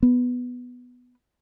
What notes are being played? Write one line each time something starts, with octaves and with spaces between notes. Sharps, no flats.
B3